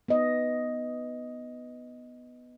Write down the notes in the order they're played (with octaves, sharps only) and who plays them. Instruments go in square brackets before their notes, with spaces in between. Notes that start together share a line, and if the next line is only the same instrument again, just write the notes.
[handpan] B3 D#5